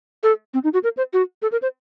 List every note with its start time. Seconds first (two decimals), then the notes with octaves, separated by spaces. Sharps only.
0.23 A4
0.54 C4
0.64 D#4
0.74 F#4
0.84 A#4
0.97 C5
1.13 F#4
1.42 A4
1.52 A#4
1.62 C5